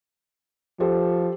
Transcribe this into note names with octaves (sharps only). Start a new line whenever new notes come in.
F3 G4 A4 C5